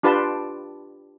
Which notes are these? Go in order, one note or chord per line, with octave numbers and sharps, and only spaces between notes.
D4 F4 G4 B4 A5 C6